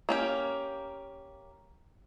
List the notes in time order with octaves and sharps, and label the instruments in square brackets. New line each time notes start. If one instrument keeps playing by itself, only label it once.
[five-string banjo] A#3 C#4 G4